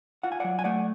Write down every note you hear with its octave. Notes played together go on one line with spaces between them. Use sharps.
F4 F#5
G#5
F#3 D5 F#5
G#5
A3 D5 F#5